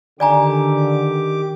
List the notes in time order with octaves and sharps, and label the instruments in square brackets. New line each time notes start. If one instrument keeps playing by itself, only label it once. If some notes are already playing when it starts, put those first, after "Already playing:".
[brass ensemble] D3 [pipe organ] D#3 G4 D6 [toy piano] D5 G#5 A#5